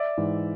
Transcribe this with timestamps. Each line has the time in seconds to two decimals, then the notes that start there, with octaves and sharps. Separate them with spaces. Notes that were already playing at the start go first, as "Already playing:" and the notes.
Already playing: D5 E5
0.17 G#2 E3